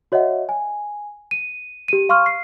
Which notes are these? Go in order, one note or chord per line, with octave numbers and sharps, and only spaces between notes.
F#4 C#5 D#5 E5 F#5
G#5
D#7
G4 D#7
F5 C6 C#6 F6
C7